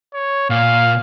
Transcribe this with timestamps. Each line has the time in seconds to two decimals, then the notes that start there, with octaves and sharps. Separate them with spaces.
0.14 C#5
0.50 A#2 F5